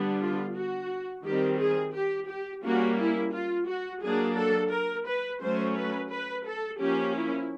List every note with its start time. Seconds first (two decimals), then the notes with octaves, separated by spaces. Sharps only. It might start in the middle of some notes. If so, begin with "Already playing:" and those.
Already playing: D3 G3 B3 D4
0.20 F4
0.56 F#4
1.24 D#3 G3 C4 G4
1.59 G#4
1.94 G4
2.29 G4
2.64 G3 A#3 C#4 F#4
2.99 E4
3.34 F4
3.68 F#4
4.03 F#3 A#3 D4 G#4
4.38 A4
4.72 A#4
5.08 B4
5.42 F#3 A3 C#4 C5
5.77 B4
6.12 B4
6.46 A4
6.81 F3 A#3 C#4 G4
7.16 E4